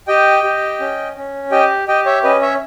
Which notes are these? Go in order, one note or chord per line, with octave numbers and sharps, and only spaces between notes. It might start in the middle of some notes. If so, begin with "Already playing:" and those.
G4 D#5 G5
G4
C#4
C#4
G4 D#5 G5
G4 D#5 G5
C#5 E5
C#4 B4 D#5
C#5 E5